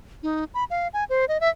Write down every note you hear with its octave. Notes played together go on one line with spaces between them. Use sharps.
D#4
B5
F5
G#5
C5
D#5
E5